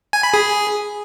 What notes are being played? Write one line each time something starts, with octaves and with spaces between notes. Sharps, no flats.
G#5
B5
G#4